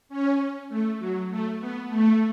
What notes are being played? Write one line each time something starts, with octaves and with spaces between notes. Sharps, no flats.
C#4
A3
F#3
A3
B3
A3